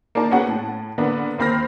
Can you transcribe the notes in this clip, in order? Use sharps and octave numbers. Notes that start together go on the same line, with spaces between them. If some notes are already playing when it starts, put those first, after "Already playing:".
A#3 D4 D#4 D5 A5 A#5
B3 C#4 F#4 G#4 F#5 G5
A2 A5
D3 A#3 B3 D4
D#2 A#3 C4 B5 F6 A#6